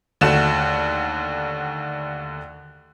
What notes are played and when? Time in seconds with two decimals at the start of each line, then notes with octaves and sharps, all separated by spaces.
0.21 D#2 D3 A3 F#4 E7